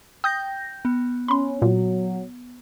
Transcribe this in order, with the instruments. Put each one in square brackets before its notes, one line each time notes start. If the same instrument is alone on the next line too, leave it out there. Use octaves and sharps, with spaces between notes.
[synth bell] G5 G6 A#6 [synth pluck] D#6
[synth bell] B3
[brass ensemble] C#4 [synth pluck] B5 C6
[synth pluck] A#2 [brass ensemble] F#3